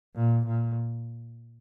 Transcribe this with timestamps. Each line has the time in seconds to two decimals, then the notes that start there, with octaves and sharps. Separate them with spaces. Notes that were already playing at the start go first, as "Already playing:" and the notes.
0.16 A#2
0.46 A#2